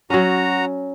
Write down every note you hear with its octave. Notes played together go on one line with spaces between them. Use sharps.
F#3 C#4 F#4 A#5